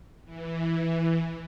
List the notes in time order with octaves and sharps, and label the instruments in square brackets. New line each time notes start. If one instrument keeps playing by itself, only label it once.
[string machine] E3